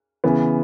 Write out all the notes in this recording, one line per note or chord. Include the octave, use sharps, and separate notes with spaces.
C#3 E3 B3